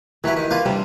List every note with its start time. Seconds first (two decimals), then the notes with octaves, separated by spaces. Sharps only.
0.24 E3 F#3 E4 G4 B4
0.37 D#3
0.51 A#3 F4 B4
0.65 C3 G3 D4